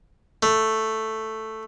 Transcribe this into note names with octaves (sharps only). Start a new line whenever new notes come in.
A3